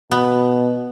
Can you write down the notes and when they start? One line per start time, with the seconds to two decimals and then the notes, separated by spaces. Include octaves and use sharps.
0.11 B2 B3